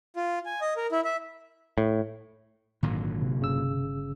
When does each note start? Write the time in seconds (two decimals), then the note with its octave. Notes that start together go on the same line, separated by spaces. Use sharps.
0.16 F4
0.46 G#5
0.61 D#5
0.77 A#4
0.92 E4
1.05 E5
1.78 A2
2.83 G#1 A#2 D3 F#3
3.21 C3
3.39 G1 C#3 E6